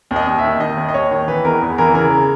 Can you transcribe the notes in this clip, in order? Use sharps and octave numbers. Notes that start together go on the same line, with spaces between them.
D#2
D#5
D#2
E5
D#3
D#3 D#5
D#2
D#5
D#2 C#5
D#3
E3 B4
E2 A#4
E2
E3 A#4
C#3 A#4